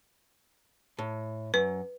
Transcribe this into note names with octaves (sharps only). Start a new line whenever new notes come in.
A2
F#2 B4